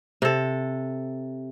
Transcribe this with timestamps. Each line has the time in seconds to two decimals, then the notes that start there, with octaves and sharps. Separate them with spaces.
0.22 C3 A4